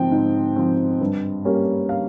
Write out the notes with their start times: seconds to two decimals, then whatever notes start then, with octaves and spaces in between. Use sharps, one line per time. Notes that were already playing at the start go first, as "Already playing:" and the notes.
Already playing: G#2 F3 C4 G5
0.12 G#2
0.56 F3 C4
1.01 G2
1.45 G3 A#3 C#4
1.89 F5